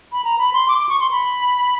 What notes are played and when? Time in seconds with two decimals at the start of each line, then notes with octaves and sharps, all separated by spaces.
0.12 B5
0.24 A#5
0.38 B5
0.53 C6
0.68 D6
0.78 D6
0.89 C#6
1.00 C6
1.11 B5